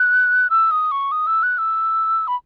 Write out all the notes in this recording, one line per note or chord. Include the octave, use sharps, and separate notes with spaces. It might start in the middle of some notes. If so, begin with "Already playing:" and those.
Already playing: F#6
E6
D#6
C#6
D#6
E6
F#6
E6
B5